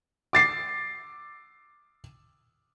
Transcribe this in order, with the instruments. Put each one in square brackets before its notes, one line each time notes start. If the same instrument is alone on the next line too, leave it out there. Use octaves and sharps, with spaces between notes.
[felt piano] D6 A6 C7